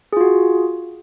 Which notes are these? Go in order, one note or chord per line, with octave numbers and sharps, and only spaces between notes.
F4 F#4 G#4